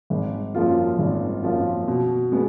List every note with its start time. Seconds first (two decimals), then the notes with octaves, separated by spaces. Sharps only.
0.10 G#1
0.55 F#2 F3 A#3 F4
0.99 G#1
1.43 F#2 F3 A#3 F4
1.88 B2
2.32 G#3 B3